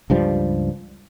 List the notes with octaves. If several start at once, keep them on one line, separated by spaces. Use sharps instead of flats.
C#2 G2 F3 G3